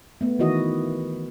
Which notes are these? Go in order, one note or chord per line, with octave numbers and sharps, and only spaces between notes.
A3 B3
D#3 E3 E4 F#4 D#5